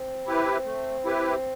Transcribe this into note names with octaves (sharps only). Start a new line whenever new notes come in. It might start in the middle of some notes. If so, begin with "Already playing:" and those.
Already playing: C4
E4 G4 B4
A3
E4 G4 B4